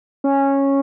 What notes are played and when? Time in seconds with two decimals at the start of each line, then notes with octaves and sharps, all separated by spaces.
0.24 C#4